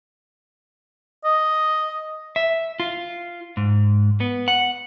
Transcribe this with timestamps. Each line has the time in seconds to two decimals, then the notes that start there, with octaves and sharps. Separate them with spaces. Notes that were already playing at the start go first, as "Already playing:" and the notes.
1.25 D#5
2.36 E5
2.80 F4
3.57 G#2
4.20 B3
4.48 F#5